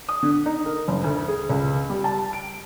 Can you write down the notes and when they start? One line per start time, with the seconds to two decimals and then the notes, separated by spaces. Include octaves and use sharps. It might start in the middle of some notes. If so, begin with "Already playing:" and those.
0.09 D#6
0.23 D3
0.46 D#4
0.65 A#4
0.88 F#1
1.04 D2
1.28 G#4
1.49 C#2
1.90 G3
2.04 A5
2.33 D7